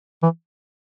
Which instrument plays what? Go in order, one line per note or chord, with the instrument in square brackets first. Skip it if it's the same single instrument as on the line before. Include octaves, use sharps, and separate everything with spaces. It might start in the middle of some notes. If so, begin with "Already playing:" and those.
[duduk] E3